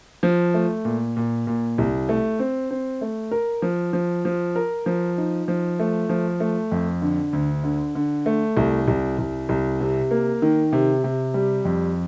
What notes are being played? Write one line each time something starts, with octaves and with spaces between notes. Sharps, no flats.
F3
A3
A#2
A#2
A#2
C2
A3
C4
C4
A3
A#4
F3
F3
F3
A#4
F3
D#4
F3
A3
F3
A3
F2
D3
D2
D3
D3
A3
C2
C2
C2
C2
C3
A#3
D#3
C3
C3
G3
F2